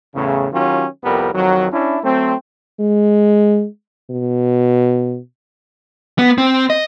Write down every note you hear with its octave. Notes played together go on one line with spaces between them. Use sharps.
E2 A2 C#3
D#3 F#3 C#4 F4 G4
C2 F2 G3 B3 A#4
F2 D#3 F#3
C#4 D4 E4
F#3 A3 C4
G#3
B2
B3
C4
D#5